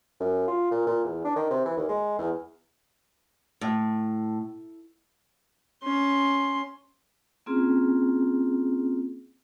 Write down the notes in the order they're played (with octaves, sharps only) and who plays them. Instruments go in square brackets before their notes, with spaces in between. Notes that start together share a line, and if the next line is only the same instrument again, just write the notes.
[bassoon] F#2
F4
A#2
A#2
E2
D4
D#3
C3
E3
D#2
G#3
E2
[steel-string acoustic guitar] A2
[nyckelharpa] C#4 C6
[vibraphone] A#3 C4 C#4 F4 G#4